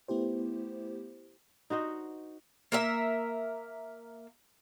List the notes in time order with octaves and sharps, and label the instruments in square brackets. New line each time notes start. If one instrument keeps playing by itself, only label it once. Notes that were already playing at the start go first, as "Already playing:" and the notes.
[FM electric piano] A3 B3 E4 G4 C5
[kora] D#4 F#4 C5 D#5
[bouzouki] A#3 A#4 E5